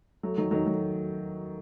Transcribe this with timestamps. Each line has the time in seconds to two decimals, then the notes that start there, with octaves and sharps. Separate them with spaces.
0.23 F#3 A3
0.37 D#3 F#3
0.51 D#3 F#3
0.66 F#3 A3